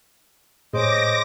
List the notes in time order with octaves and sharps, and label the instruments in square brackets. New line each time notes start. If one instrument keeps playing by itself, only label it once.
[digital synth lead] A2 [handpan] G#4 C#5 [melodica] C5 D#5 [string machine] D6 A#6